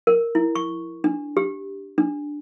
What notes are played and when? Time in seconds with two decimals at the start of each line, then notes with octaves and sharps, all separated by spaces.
0.07 A#4
0.35 E4
0.55 C#6
1.04 D4
1.37 G4
1.98 D4